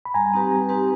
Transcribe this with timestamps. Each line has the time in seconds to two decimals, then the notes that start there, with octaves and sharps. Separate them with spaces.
0.05 B5
0.14 G3 G#5 A#5
0.33 C4 D#4 G4 B4
0.51 G3
0.69 C4 D#4 G4 B4